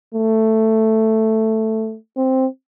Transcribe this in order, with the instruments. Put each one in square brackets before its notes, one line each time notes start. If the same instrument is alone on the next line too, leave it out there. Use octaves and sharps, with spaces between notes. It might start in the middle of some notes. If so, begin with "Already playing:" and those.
[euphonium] A3
C4